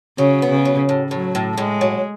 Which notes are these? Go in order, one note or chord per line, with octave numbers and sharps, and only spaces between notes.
C#3 F#3
B3
C#3
F#3
A2
A2 F#3
A2
A2 G#3
F#3